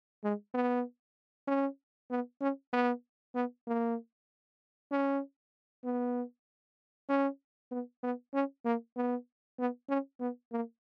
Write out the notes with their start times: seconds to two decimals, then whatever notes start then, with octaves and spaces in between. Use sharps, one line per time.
0.24 G#3
0.54 B3
1.48 C#4
2.11 B3
2.41 C#4
2.73 B3
3.35 B3
3.67 A#3
4.91 C#4
5.85 B3
7.09 C#4
7.71 B3
8.03 B3
8.34 C#4
8.65 A#3
8.97 B3
9.59 B3
9.89 C#4
10.20 B3
10.52 A#3